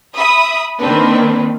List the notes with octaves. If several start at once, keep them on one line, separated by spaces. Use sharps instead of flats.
E5 B5 D#6
D#3 A#3 C4 D4 B4